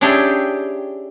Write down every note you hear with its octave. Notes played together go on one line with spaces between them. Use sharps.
C#4 D4 E4 G4 G#4 G5